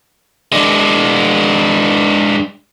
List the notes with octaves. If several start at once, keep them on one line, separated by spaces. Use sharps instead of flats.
G#3 D4